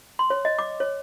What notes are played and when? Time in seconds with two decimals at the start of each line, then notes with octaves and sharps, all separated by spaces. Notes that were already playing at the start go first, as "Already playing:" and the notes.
0.19 C6
0.30 C#5
0.45 D#5
0.59 D6
0.80 C#5